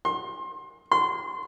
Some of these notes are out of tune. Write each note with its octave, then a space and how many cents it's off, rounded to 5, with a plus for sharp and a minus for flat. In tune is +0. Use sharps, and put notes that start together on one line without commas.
C6 +25
C6 -25